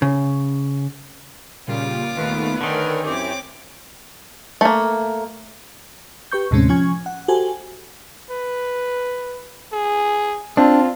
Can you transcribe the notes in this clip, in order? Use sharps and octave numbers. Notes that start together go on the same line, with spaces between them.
C#3
A#2 C#3 G3 F4 D6
D#2 D#3 A3 B3 B4
D3 D#3 A#4 C#5 D5 G5 G#5
F#2 E3 C4 G4 D6
A3 A#3
G4 B4 C#6 G6
D#2 A2 C3 G#3 C4 C#4
F3 C#4 G#5 C#6 G#6
F#5
F#4 G4 A4 C5 G#5
B4
G#4
C4 D4 F4